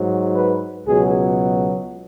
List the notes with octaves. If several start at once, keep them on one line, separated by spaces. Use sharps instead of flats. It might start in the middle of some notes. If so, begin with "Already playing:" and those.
Already playing: G#2 F#3
B4
C#2 B2 F#3 G#4